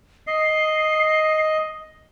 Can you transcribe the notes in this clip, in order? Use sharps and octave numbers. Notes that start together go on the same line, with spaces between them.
D#5 C7